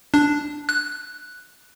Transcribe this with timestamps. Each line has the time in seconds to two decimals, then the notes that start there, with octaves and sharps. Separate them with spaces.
0.14 D4
0.69 F#6